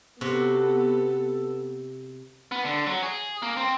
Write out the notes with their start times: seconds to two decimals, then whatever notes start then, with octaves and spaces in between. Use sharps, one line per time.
0.21 C3 B3 F#4 A4
2.52 B3
2.65 D3
2.87 F#3
3.03 G#4
3.42 A#3
3.57 C4